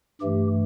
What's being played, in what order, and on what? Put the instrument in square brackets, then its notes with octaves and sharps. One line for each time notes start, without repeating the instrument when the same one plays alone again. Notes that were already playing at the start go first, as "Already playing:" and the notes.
[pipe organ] G2 E3 A3 G4